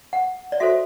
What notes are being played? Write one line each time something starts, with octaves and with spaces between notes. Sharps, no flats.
F#5
D5
F#4 A4 C5 E5